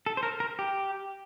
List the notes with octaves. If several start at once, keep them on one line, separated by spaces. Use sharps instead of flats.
A4
C5
A#4
A#4
G4